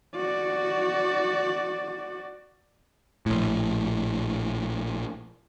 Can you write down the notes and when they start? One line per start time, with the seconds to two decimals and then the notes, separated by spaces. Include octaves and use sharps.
0.16 F#4 D5
3.26 A#1 A2